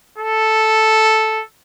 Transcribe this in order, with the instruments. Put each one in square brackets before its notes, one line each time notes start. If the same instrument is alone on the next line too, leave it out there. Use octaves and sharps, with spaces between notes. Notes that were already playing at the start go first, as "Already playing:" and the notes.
[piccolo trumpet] A4